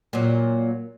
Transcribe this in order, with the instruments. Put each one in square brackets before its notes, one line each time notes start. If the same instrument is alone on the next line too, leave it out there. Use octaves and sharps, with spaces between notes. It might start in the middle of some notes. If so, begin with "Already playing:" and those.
[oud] A#2 F#3